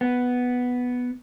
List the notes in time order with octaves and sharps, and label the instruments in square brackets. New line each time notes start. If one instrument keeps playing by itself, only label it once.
[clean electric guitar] B3